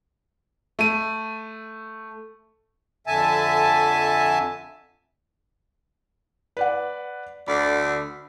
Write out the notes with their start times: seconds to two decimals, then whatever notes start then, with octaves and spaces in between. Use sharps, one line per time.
0.79 A3 D#7
3.07 F2 D3 E5 G#5 A5
6.57 B4 D5 F#5
7.48 D2 D3 D5 B5